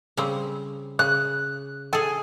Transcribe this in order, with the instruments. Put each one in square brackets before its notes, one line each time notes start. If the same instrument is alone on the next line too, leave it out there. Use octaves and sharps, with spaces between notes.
[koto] C#3 G3 C4
[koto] C#3 [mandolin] F#6
[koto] G#4 A4 [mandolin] G#5